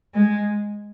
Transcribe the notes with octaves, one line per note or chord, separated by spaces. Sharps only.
G#3